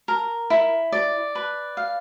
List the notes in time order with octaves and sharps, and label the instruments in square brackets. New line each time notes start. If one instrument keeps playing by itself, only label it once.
[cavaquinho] A#4
E4
D5
B4
F5